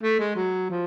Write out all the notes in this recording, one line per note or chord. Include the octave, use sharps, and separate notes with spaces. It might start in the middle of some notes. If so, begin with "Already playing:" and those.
A3
G#3
F#3
F3